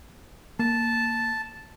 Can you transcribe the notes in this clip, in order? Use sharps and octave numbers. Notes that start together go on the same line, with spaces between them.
A#3 A5